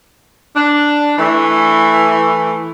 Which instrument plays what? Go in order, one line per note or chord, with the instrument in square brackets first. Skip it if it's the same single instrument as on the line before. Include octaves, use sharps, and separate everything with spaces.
[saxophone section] D4
E3 A3